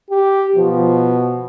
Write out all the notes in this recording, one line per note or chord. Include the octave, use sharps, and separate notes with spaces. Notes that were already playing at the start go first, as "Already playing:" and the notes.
G4
B2 F3